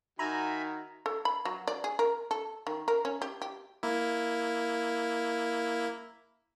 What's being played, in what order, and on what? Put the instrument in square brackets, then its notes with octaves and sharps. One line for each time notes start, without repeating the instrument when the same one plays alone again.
[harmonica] D#3 [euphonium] F#4 [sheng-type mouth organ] E5 G#5 B5 [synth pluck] A#5
[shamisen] A4
B5
F#3
D5
G#4
A#4
A4
D#3
A#4
C#4
G4
G4
[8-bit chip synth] A#3 E4